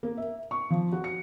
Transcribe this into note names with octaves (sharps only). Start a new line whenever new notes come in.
A#3
E5
C#6
F3
F#4
C#7